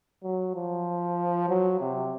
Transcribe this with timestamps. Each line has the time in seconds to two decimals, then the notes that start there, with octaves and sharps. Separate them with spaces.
0.23 F#3
0.55 F3
1.49 F#3
1.80 C3